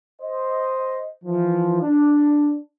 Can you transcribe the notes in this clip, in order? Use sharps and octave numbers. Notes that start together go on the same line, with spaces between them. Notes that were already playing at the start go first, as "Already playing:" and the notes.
C5 D#5
E3 F3
D4